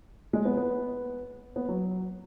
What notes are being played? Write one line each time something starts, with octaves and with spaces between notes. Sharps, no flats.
G#3
B3
B3
B3
F#3